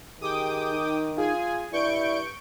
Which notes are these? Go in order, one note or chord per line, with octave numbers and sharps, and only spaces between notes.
D#3 G4 G#4 G5 D6 D#6
D#4
F4 G#4 G#5
G2 E4 D5 C#6 G6 D7